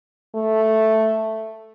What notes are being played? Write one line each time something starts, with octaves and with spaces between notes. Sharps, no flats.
A3